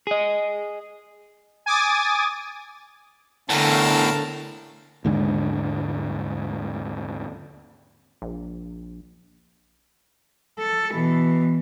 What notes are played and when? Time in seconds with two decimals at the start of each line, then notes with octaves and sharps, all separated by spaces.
0.07 G#4 D#5
1.66 G#5 D6 D#6 A6
3.50 E2 A2 D3 A3 A#4 F5 A5
5.05 D#2 G#2 D3 G#3
8.22 A#1
10.59 A4
10.92 B2 E3